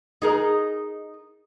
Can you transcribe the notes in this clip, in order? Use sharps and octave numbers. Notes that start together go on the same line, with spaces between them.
D#4 G#4 A#4